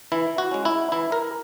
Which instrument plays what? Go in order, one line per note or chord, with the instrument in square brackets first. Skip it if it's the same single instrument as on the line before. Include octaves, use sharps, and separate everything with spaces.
[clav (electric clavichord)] E3 E4
F#4
G#3 C#4
E4
E3 E4
A#4